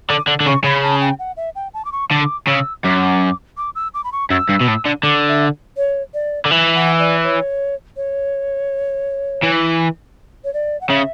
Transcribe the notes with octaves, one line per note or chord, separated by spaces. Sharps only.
D3 D6
D3
D3
C#3 C#6
C#3 B5
A5
G5
F#5
E5
G5
A5
D6
C#6
D3 D6
C#3 E6
F#2 D6
D6
E6
D6
B5
C#6
F#2 E6
G2
B2
A2
D3
D3 D6
E5
C#5
D5
D3
E3 E5
F#5
D5
C#5
C#5
E3
C#5
D5
F#5
C#3 E5